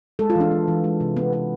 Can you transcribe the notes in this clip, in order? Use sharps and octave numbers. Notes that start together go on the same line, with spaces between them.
G#3 A4
F4
E3 D4
B3
E3
G#3
C3
B3
B3